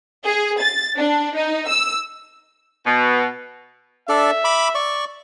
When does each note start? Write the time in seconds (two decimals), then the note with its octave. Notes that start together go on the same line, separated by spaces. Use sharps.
0.24 G#4
0.61 A6
0.98 D4
1.36 D#4
1.69 E6
2.86 B2
4.09 D4 A4 D5 E5
4.45 B5 D6
4.75 D5 C#6